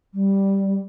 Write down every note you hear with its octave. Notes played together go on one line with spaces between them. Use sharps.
G3